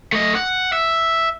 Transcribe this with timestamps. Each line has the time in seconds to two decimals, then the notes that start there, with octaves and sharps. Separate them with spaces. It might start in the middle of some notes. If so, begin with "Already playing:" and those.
0.13 A3 D#5
0.35 F#5
0.73 E5